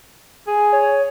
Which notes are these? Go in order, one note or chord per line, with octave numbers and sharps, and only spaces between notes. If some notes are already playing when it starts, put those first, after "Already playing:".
G#4
C#5